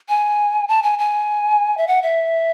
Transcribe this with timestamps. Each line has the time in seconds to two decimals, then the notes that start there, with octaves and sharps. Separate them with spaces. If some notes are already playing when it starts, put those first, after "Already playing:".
0.09 G#5
0.68 A5
0.83 G#5
0.99 G#5
1.78 E5
1.88 F#5
2.02 E5